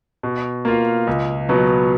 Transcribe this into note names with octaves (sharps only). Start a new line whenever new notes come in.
B2
A#3 F4
C#2
B2 F#3 B3